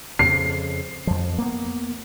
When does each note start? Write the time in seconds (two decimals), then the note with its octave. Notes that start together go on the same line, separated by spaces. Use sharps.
0.19 F2 C#3 C7
1.07 F2 F3
1.38 A#3 B3